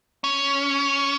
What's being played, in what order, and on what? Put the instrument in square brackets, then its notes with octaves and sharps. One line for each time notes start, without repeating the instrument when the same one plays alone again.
[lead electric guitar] C#4